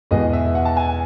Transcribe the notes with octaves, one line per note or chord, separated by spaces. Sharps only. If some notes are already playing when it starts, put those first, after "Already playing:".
E2 B2 G#3 B3 D#5
E5
F#5
A5
G#5